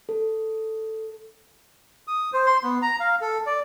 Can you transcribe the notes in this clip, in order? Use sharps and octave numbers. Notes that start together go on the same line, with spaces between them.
A4
D#6
C5
C6
B3
A#5
F5
A4
D5